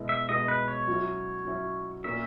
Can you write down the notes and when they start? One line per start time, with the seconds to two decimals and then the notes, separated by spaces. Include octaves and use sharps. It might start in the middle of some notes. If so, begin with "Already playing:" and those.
Already playing: B2 G#3 B3 E4
0.09 E5
0.29 B2 G#3 B3 E4 D#5
0.48 B4
0.68 C#5
0.88 F#3 C#4 E4
1.45 F#3 C#4 E4
2.04 A#2 A#3 C#4 E5